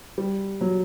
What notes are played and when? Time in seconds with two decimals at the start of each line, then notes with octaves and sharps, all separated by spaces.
0.18 G3
0.61 F#3